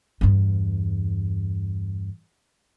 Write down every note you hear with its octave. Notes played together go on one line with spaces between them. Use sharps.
E2 G2